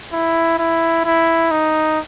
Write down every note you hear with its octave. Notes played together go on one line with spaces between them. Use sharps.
E4
E4
E4
D#4